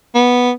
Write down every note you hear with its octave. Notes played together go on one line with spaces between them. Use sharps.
B3